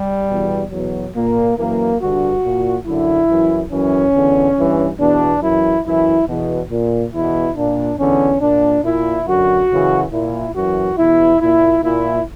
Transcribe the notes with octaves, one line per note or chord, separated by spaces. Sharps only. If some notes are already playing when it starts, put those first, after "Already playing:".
Already playing: G3
E2 B2
E2 B2 F#3
A#2 A#3
F#2 E3 A#3
G2 D3 F#4
A#2
F#2 D3 E4
F#2 E3
F#2 E3 C#4
E2 D3
G2 E3
E2 B2 D4
F#2 E3 E4
F#2 E3 E4
E2 B2
A#2
E2 B2 E4
A#2 D4
E2 D3 C#4
A#2 D4
A#2 E4
F#2 D3 F#4
F#2 C#3 E3
A#2 E4
F#2 E3 F#4
E2 B2 E4
A#2 E4
A#2 E4